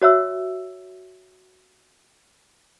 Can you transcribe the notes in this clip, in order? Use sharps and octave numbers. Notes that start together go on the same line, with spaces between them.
F#4 C#5 E5 E6